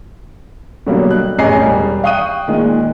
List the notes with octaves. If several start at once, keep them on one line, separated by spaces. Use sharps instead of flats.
B2 D3 F#3 G3 A#3
F#6
A1 C#4 G#4 D#5 G#5 C7
E1 G3
F5 G5 C#6 D#6 F#6 D#7
A#2 D#3 G#3